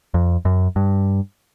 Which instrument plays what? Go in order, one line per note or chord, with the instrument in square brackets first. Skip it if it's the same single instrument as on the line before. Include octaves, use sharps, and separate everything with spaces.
[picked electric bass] F2
F#2
G2